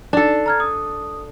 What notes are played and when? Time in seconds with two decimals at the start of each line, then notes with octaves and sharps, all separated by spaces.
0.13 D4 D#4 A4
0.46 A#5 F6 G#6
0.60 D#6